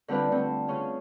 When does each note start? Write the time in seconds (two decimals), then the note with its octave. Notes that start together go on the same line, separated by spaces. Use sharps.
0.08 D3 G3 C4 F4 B4
0.32 D3 A3 C4
0.68 C#3 C#4 F4